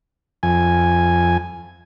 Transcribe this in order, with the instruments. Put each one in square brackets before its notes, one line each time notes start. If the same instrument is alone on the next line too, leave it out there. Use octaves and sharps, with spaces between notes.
[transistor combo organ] F2 G#5